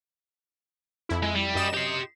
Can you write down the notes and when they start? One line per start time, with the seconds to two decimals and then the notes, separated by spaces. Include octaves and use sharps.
1.09 F2 E4
1.23 G#3
1.35 G3
1.55 F#2 D#5 E7
1.74 G4 C6